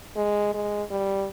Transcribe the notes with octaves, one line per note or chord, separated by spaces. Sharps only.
G#3
G#3
G3